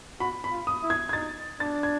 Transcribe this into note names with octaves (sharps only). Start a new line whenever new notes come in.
F#4 B5
B5
F4
D#6
E4
G#6
G#6
D#4 A6
D4 A6
G#6